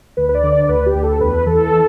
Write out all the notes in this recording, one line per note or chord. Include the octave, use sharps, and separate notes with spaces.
D2 B4
B4
D5
D3
D5
D5
D2 B4
G4
D2
A4
E2 B4
E3 A4